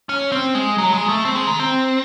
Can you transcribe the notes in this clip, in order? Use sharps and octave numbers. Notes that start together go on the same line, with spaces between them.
C#4
C4
G#3
F#3
G#3
A3
C4
G#3
D#3
C4